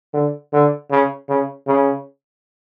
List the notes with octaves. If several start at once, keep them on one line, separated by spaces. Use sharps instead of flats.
D3
D3
C#3
C#3
C#3